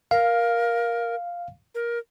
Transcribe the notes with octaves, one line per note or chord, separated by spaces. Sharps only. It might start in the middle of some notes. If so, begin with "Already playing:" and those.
A#4 F5
A#4